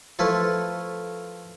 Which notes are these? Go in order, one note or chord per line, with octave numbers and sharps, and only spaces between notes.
F3 A3 E4 F4 B4